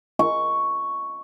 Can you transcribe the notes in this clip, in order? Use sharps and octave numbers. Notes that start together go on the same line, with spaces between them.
C#6